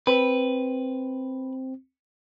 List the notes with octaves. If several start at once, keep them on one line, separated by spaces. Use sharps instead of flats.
C4 B4